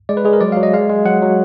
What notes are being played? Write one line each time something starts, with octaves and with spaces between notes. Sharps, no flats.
G#3 D5
B4
G#3 G#4
A#4
F#3 D5
F#3 F5
D#5
G#3 F5
G#3
F#3 F#5
F#3